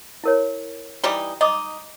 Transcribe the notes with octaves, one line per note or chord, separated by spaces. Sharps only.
E4 A#4 C#5
E3 G3 D#4
D#4 D#5 D6 D#6